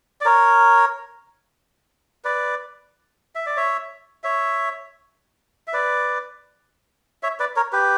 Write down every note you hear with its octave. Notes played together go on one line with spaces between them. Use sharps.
D5
A#4 C#5
B4 D5
E5
D5
C#5 E5
C#5 E5
E5
B4 D5
C#5 E5
B4 D5
A#4 C#5
G4 B4